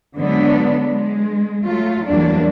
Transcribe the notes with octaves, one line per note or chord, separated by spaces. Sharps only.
D3 F#3 G#3 B3 D4
G#3
F#3 A3 F4
E2 F#3 G3 A#3 D4